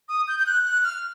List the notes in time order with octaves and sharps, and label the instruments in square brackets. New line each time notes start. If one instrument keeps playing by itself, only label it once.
[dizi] D#6
G6
G6
F#6
F#6
F6